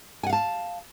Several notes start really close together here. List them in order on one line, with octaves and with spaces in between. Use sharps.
G#5 F#5 F5 A5